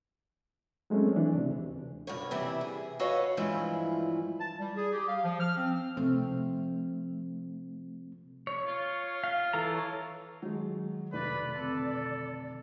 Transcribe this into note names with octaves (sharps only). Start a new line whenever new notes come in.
F#3 G#3 A3 C4 C#4
E3 D4
C#2 C3
D2
G2 B2 C#5
C3 E3 G3 E4
G#4
F#4 A4 B4 C#5 D#5 F5
G2 E3 F3 G#3 E4 F4
A5
G3
G#4
G4
F5
F3
F6
C4
C3 F3 A3 C4
C#5
F4
F5
E3 A4 A#5
C#5
D#3 F#3 G#3
F1 B4 D5
B2 D3 C4 A4